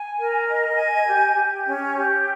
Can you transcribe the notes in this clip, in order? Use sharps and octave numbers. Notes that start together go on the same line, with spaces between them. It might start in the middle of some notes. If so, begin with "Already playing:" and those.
Already playing: G#5
A#4
D#5
G#5
G4
G4
C#4
G4